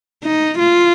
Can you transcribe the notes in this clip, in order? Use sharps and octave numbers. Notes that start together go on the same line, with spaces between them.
D#4
F4